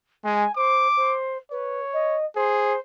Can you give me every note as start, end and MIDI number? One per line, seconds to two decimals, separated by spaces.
0.24 0.45 56
0.24 0.52 80
0.56 0.88 72
0.56 1.16 86
0.97 1.38 72
1.51 1.80 71
1.51 2.17 73
1.93 2.25 75
2.36 2.75 68
2.36 2.80 72